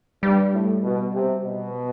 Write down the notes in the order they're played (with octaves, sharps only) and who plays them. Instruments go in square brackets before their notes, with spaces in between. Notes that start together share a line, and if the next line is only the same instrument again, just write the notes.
[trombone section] G2 [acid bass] G3
[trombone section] A2
B2
C3
B2